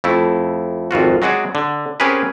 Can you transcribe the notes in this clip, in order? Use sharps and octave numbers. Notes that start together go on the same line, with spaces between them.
F2 A3 E4
G#1 F2 F4 F#4
F#3 G#3 F#4 G#4 D5
D3
C4 C#4 G4 G#4 A#4 B4